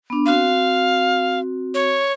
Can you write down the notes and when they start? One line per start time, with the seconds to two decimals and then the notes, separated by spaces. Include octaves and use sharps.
0.10 B3 D4
0.26 C4 F#4 F5
1.74 C#5